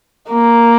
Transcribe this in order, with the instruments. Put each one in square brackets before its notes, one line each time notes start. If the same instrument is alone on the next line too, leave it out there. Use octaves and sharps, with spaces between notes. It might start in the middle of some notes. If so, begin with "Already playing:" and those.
[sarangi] A#3